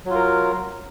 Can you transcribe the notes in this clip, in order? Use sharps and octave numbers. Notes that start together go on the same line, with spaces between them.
F#3 F4 A#4